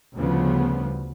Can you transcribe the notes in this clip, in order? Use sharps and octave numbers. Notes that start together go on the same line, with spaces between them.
D2 C#3 F3 G3 B3